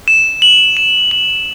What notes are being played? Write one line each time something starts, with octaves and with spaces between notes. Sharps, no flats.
E7
F#7
E7
F#7